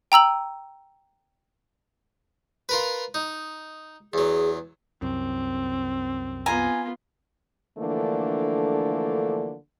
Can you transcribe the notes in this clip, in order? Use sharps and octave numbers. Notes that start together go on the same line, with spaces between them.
G5 A#5 E6 F#7
F4 A#4 B4
D#4
E2 F#3 G#4
C2 F#2 C4
B3 F4 G#5 A#5
D3 E3 F3 A3 A#3 D4